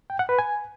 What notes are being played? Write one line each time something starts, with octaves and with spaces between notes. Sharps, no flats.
G5
F#5
B4
G#5